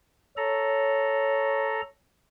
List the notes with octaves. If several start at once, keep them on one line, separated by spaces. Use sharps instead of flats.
A4 C#5 A#5